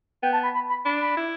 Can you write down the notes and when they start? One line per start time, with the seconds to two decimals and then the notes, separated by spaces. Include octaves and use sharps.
0.23 B3 G5
0.33 A5
0.43 B5
0.54 B5
0.69 B5
0.85 D4 B5
1.01 B5
1.16 E4